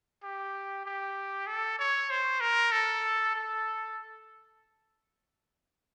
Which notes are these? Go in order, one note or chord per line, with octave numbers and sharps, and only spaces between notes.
G4
G4
A4
C#5
C5
A#4
A4
A4